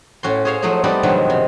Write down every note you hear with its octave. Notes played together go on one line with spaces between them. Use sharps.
A2 C#4 F#4 C6
G#4 C5 C#5 F5 G#5
F3 F#3 A3 D#4 G#4
G3 B3 C4 D#4 A4 D5
G2 B2 D#3 F3 F#3 G#3
C3